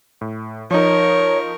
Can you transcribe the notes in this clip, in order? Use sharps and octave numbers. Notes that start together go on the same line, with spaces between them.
A2
F3 D#4 A#4 C#5 C#6